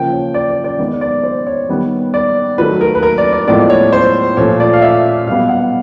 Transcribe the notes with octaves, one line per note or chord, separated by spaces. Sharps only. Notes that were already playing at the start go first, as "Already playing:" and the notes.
Already playing: C#3 F3 A#3 G5
C#5
D5
D5
D5
D#3 G#3 B3 D5
D5
C5
C#5
D#3 G3 B3
D5
D#3 F#3 A3 B4
A#4
B4
A#4
D5
D5
A2 F3 G#3 B3 D5
D5
C#5
C5
A#2 F3 A3 C#5
D5
F5
E5
B2 G3 B3 F5
F#5